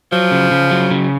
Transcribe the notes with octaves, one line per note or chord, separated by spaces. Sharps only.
F3 F#3
C#3
C#3
F#3
C#3